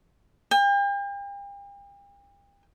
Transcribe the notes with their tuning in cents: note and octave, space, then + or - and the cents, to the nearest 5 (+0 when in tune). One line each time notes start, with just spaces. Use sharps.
G5 +40